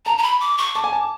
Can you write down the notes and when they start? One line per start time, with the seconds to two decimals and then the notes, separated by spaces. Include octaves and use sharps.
0.05 A5 A#5
0.18 A#5
0.23 B5
0.40 D6
0.58 C#6
0.74 A5 D6
0.84 G#5
0.93 A5